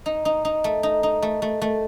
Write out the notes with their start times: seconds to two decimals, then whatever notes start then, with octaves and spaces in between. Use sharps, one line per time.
0.06 D#4
0.25 D#4
0.45 D#4
0.64 A3
0.83 D#4
1.03 D#4
1.22 A3
1.42 A3
1.62 A3